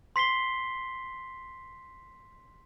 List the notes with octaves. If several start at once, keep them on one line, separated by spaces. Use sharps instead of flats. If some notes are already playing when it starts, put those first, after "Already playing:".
C6 B6 C7 G7